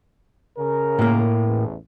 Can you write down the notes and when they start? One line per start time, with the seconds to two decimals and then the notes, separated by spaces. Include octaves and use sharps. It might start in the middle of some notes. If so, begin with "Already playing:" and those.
0.58 C#3 A#4
0.99 A2 A#3
1.45 A1 E2